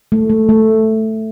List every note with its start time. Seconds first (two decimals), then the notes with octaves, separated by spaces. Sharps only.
0.12 A3
0.30 A3
0.49 A3